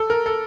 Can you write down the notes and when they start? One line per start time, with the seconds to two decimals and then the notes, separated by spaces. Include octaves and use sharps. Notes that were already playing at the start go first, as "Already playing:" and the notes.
Already playing: A4
0.10 A#4
0.26 A4